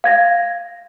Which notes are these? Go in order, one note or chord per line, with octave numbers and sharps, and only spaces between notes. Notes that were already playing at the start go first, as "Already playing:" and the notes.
F5 G#6 A#6